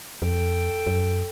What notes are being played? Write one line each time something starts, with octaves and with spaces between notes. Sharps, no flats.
F2 A4 G5
F#2